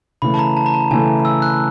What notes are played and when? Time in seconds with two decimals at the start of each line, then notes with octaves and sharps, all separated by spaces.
0.22 C#3 E3 A3 B5
0.34 A5
0.39 A#5
0.57 A5
0.66 A#5
0.74 A5
0.91 C#3 E3 A3 G#5
1.25 E6
1.42 F#6